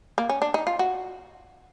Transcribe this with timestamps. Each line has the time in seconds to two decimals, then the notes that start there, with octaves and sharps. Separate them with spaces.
0.18 A#3
0.29 C#4
0.42 D4
0.54 D#4
0.67 F4
0.79 F#4